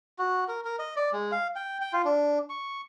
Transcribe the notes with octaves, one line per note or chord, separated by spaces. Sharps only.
F#4
A#4
A#4
D#5
D5
G#3
F5
G5
G5
F4
D4
C#6